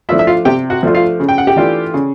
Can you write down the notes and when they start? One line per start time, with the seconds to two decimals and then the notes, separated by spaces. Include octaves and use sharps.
0.09 F3 A3 D4 E4 F4 E5
0.19 E5
0.27 F4 F5
0.45 C3 G4 G5
0.70 F#4 F#5
0.83 F3 A3 D4 F4
0.94 F4 F5
1.20 C#3
1.29 G5
1.38 F#5
1.47 G4 G5
1.56 E3 A3 D4 F4
1.94 C#3